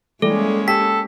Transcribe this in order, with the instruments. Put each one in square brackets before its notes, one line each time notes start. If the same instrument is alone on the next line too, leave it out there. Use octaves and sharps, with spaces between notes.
[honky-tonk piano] E3 G3 [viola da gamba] G#3 A#3 C#4 [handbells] A4
[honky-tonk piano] G4 [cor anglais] A4 [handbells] B6